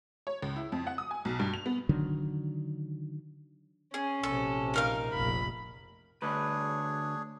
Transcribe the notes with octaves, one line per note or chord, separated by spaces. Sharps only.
C#5
C#2
E4
F2
F#5
D#6
G#5
B1
G2
F7
B3
D3 D#3 F#3 D4
C#4 G#4
A#1 C3 A4
D#4 A#4 F5
F1 A#1 B5
D2 D4 G#4 B4 C#5